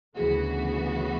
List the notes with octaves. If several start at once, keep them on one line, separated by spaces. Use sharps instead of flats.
D2 C#3 E3 B3 F#4 G#4